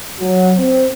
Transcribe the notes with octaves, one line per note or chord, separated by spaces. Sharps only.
F#3
C4